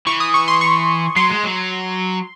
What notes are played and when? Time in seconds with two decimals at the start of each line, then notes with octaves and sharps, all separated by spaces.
0.07 E3 C#6
0.20 D#6
0.34 C#6
0.48 C6
0.61 C#6
1.16 F#3 C6
1.30 G#3
1.43 F#3